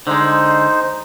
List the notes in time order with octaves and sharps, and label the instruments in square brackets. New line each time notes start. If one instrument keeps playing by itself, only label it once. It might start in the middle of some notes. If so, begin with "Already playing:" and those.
[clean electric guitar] D3 G#3 [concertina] D#4 C5